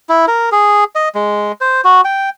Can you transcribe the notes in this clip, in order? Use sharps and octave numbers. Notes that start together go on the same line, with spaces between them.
E4
A#4
G#4
D#5
G#3
C5
F#4
G5